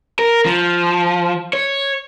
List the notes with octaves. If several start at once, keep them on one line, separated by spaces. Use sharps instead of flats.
A#4
F3
C#5